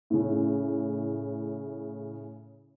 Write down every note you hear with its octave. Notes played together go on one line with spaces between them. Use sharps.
A2 C#3